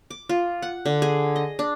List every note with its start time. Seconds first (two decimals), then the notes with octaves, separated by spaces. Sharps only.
0.10 D6
0.29 F4
0.62 F#5
0.86 D3
1.02 G#4
1.36 D#5
1.59 D4